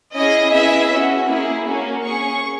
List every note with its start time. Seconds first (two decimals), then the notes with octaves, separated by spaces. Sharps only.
0.15 C#4 E4 G#4 D#5
0.53 B3 E4 G#4 E5
0.91 C#4 F#4
1.28 A#3 E4 G#4
1.66 A#3 C#4 F#4
2.04 C#4 G#4 C#6